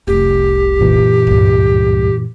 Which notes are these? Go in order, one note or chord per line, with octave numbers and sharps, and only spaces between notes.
F1 C2 G4
F#2 A#2 E3
C#2 G2